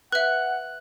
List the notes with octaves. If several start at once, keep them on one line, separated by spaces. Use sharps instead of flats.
B4 E5 F#5 F#6